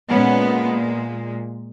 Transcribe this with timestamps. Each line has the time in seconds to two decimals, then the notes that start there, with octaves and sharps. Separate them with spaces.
0.10 A#2 G#3 B3 C#4